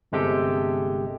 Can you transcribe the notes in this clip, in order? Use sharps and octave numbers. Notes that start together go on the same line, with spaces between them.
G1 C3 G#3 G4 A4 G5